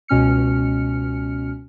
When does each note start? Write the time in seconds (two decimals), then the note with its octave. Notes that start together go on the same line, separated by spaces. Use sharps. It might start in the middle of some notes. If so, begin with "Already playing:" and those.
0.08 C#2 B2 C#4 F6 C#7